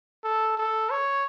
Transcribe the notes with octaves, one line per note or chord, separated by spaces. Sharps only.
A4
A4
C#5